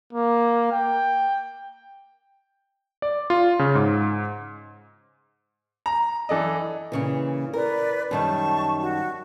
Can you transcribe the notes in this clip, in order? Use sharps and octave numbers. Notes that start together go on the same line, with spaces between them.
A#3
G5
D5
F4
C#3
G#2
A#5
E3 A4 D5 D#5
A#2 C#3 E3
A#4 B4 D5
F#2 D#3 G3 A5 C#6
F#4